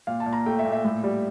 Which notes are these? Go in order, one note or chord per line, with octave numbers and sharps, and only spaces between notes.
A#2 F5
A5
A#2
A#5
A3 G5
E5
A#2
E5
A2
G3